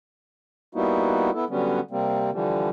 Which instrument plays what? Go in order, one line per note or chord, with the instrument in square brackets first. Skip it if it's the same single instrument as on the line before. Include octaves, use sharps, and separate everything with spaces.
[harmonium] G3 A#3 B3 D#4 E4 F#4
B3 E4 A4
D3 F#3 G3 B3 C#4
C3 G3 A#3 C4
D3 E3 F3 G3